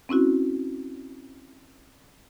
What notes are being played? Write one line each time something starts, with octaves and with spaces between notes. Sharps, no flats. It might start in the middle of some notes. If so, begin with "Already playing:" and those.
C4 C#4 E4 F#4